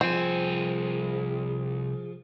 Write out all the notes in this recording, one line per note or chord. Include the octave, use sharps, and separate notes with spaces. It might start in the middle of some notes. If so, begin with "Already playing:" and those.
C2 F3 C4 G#4 G#5